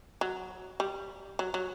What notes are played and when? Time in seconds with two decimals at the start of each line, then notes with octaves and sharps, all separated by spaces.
0.21 F#3
0.80 G3
1.39 F#3
1.54 F#3